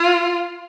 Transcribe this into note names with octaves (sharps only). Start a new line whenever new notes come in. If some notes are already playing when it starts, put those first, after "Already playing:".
Already playing: F4